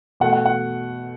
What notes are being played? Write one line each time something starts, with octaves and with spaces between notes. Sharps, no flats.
B2 A3 F#5
F#5
F#5